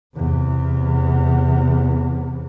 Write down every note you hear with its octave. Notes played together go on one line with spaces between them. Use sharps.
E2 C3